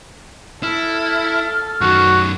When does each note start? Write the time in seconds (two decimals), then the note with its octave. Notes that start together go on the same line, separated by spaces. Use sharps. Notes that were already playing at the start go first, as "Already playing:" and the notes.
0.63 E4 A4 F6
1.81 F#2 D#3 F#4